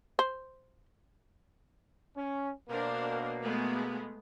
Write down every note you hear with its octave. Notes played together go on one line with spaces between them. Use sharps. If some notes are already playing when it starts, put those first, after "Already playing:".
C5
C#4
B2 A#3 D4 A#4 C5
G#3 A3 B3